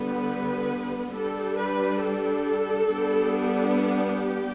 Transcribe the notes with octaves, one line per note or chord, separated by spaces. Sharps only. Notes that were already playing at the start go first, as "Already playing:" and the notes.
Already playing: D3 G3 B3 B4
G3 D4 A4
B4
A4
G3 B3 D4
G4